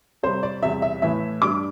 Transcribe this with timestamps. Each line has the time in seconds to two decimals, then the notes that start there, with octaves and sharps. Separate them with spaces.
0.23 C3 G3 C5
0.43 D5
0.62 E2 C3 G3 E5
0.82 E5
1.02 A2 E3 A3 E5
1.42 G2 G3 D6